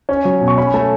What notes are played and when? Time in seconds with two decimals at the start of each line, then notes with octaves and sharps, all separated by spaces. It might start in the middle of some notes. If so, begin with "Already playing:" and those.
0.09 C#4
0.25 F#3
0.41 B2
0.48 C#6
0.58 C#4 B5
0.74 A3 A5